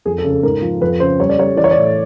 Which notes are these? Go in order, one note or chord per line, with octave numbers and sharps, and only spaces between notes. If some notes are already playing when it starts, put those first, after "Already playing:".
F2 G#4
A4
C#3
A4
G#2 A#4
F3
F2 B4
C#3 C5
G3 C#5
D5
G3 C#5
E3 D5
C#5
D5
A2